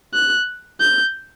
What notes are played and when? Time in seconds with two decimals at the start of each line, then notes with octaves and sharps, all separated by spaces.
0.14 F#6
0.80 G6